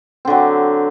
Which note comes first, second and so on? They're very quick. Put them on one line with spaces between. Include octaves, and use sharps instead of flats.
C4 D3 F#3